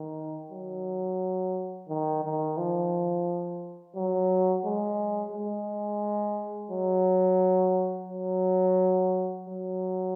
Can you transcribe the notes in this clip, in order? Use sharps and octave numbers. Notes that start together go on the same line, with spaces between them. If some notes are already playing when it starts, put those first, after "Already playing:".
Already playing: D#3
F#3
D#3
D#3
F3
F#3
G#3
G#3
F#3
F#3
F#3